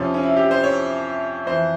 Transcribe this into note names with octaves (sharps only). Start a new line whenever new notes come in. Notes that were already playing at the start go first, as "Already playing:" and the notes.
Already playing: F2 C3 F3 C#4
C#4
E4
G4
C5
C#5
F2 E3 C5